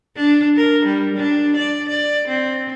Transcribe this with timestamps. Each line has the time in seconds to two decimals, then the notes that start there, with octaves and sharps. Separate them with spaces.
0.16 D4
0.57 A#4
0.85 G3
1.16 D4
1.56 D5
1.88 D5
2.28 C4